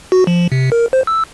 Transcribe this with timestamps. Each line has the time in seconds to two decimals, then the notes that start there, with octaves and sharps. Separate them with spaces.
0.12 F#4
0.27 F3
0.52 C3
0.72 A#4
0.93 C5
1.07 E6